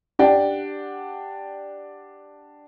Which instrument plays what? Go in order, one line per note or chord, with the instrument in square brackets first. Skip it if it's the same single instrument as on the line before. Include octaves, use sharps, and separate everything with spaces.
[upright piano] D4 G4 D5 F#5 G5